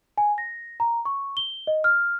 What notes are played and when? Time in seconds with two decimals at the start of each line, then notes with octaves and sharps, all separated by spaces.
0.18 G#5
0.38 A#6
0.80 A#5
1.05 C#6
1.37 G7
1.67 D#5
1.84 F6